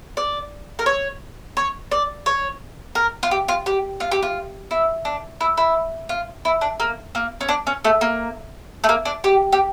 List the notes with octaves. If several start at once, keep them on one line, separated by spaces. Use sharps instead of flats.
D5
A#4
C#5
C#5
D5
C#5
A#4
F4
G4
F4
G4
F4
G4
F4
E4
D4
E4
E4
F4
E4
D4
A#3
A#3
C#4
D4
C#4
A3
A#3
A3
A#3
D4
G4
G4